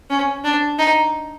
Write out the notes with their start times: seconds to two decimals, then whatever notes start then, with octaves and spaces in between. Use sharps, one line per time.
0.10 C#4
0.44 D4
0.79 D#4